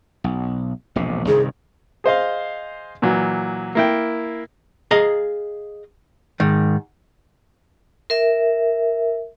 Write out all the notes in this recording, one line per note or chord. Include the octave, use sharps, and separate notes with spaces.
B1
E1 A#1 C3
C2 G2 D#3 G#4
G#4 C5 D#5 F5
A#2 E3 F#3
A#3 E4 G5
G#4 D#5 F5 A#5
G#2 D#3
A#4 E5